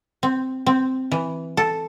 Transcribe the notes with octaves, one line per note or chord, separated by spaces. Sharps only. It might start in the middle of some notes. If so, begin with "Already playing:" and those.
C4
C4
E3
A4